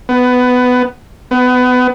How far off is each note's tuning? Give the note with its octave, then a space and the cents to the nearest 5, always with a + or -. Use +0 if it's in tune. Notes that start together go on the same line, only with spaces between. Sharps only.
B3 +15
B3 +25